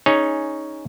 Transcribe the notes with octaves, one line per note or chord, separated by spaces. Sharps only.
C#4 D#4 G#4 C#5